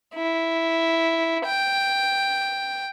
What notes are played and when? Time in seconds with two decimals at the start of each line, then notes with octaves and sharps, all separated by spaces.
0.15 E4
1.45 G5